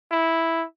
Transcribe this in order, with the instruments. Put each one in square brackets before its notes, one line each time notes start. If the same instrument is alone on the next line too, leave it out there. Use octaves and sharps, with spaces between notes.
[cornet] E4